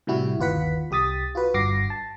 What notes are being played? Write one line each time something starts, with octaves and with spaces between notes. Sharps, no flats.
A2 C3 G3 E4 F#4
G1 D#2 F4 B4 F#5 B6
C2 G4 D#6 A6 B6
F4 F#4 B4
G1 G2 F#4 D6 A#6 C7
A5